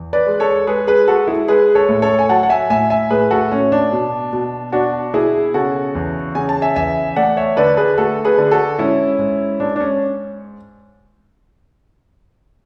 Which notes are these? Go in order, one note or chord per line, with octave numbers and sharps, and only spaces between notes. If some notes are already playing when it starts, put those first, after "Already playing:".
Already playing: E2
B4 D5
G#3
A4 C#5
G#3 G#4 B4
G#4 B4
G#3 F#4 A4
E4 G#4
G#3 G#4 B4
A4 C#5
A2
A4 C#5
G#5
F#3 F#5 A5
F#5
E5 G#5
A2 E5 G#5
E5 G#5
A2 G#4 B4
F#4 A4
A2 C#4
D4
B2
B2
B2 D4 F#4
B2 E4 G#4
C#3 F#4 A4
E2
C#3 G#5
A5
E5 G#5
E2 E5 G#5
A3 D5 F#5
C#5 E5
D3 B4 D5
G#4 B4
A3 F#4 A4
G#4 B4
D3
F#4 A4
G#2 C#4 E4
G#2
G#2 D4
D4
C#4